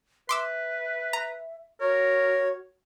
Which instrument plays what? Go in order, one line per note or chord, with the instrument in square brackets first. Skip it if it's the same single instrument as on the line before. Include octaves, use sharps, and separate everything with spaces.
[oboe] B4 [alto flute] E5 [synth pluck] C6 D6 E6
[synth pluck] A#5
[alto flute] F#4 [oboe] A#4 [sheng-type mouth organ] C#5